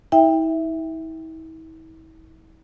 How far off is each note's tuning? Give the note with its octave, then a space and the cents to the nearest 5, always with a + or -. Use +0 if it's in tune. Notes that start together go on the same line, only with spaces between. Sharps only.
E4 -45 E5 +0 G5 +20